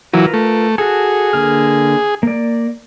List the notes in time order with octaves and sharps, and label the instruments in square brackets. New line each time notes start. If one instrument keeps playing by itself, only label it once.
[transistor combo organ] E3 F#3 [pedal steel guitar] F4 A#4 B4
[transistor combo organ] A3
[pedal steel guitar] F#4 A4 [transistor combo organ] G#4
[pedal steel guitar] D3 A#3 F6
A#3 D5